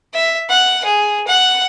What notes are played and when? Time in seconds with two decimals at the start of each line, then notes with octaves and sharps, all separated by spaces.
0.14 E5
0.49 F#5
0.85 G#4
1.27 F#5